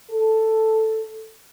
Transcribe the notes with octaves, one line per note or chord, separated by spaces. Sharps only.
A4